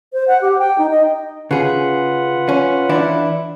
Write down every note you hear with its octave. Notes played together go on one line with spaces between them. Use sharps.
C5
F#5
G4
G5
D#4
D#5
C#3 F4 G#4 B4 F#5
C#4
E3 D4 E4